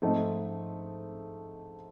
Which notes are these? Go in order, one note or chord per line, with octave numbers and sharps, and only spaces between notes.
G#2 F3 A3 C4 D#4